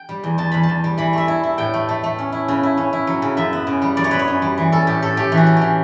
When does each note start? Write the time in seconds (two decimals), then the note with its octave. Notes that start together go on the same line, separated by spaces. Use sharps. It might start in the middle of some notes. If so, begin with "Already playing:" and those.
Already playing: G5
0.09 G3
0.24 E2
0.38 E2 A5
0.52 E2 B5
0.63 A5
0.69 E2
0.84 G3
0.97 E3 B5
1.13 A3 E5
1.28 E4
1.43 E4
1.58 A2 G5
1.74 A3
1.89 A3
2.04 A3
2.18 C#4
2.32 E4
2.48 C#3
2.63 E4
2.77 C#4
2.93 E4
3.07 F#3
3.22 C#3
3.37 F#2 E5
3.53 B3
3.67 C#3
3.82 G3
3.97 F#2 D5
4.04 C#5
4.11 B3 B4
4.19 C#5
4.28 F#2
4.42 G3
4.58 E3
4.72 C#4 A4
4.87 A2 G4
5.02 A2 A4
5.17 A3 G4
5.32 E3
5.37 F#4
5.47 C#4
5.57 E3 G4